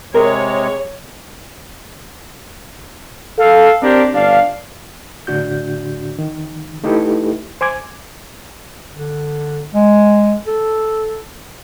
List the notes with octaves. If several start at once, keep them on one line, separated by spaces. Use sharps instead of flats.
C3 G#3 G#4 A#4 C#5
A4 F5
C4 D4 G4 A#4 C5
G1 D4 F5
A2 D3 D4 F#4 G6
D#3
A3 D#4 E4 G4 A4 B4
C5 G#5 D6 G#6
D3
G#3
A4